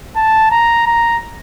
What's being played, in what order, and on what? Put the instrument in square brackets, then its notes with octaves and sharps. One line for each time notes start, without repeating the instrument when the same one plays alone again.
[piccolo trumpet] A5
A#5
A#5